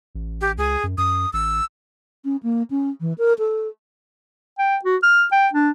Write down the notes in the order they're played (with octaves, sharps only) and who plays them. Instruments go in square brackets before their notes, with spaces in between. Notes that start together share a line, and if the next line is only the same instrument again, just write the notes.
[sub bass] A1
[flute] G4
[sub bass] C#2 [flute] G#4
[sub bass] F#2
[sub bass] F#2 [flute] D#6
[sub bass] A1 [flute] E6
[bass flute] C#4
A#3
C#4
E3
A#4
A4
[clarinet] G5
F#4
F6
G5
D4